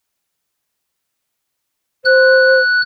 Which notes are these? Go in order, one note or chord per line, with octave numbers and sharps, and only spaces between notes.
C5 F#6